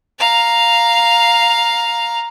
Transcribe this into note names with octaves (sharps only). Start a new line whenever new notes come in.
F5 A#5